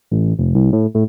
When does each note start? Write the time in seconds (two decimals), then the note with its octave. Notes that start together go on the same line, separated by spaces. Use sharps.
0.11 A1
0.39 F1
0.55 C2
0.73 A2
0.95 A2